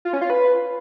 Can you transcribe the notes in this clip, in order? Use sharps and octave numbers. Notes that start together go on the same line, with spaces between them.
F4
C#4
F4
B4